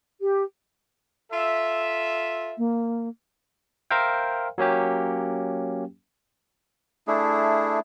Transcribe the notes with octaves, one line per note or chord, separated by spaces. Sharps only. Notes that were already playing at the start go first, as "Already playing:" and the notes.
G4
F4 A4 E5
A#3
A#4 C5 E5 F5 G5
F#3 A#3 C#4 G4
A3 D4 E4 G#4